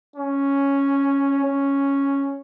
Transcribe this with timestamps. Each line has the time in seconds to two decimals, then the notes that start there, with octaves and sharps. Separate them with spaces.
0.16 C#4
1.44 C#4